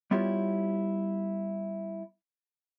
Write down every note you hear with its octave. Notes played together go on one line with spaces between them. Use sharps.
G3 B3 E4 F4 G4 C#5